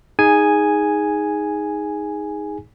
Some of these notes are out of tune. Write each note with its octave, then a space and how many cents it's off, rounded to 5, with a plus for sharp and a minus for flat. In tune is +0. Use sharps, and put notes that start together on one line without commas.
D#4 +10 G#4 -10 G#5 +0